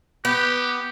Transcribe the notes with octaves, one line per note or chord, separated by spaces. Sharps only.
B3 G4